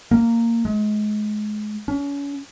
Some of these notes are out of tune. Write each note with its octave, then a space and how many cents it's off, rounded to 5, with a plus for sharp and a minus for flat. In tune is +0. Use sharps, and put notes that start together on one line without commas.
A#3 -15
G#3 +30
C#4 +35